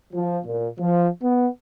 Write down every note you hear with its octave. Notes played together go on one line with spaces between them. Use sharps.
F3
A#2
F3
B3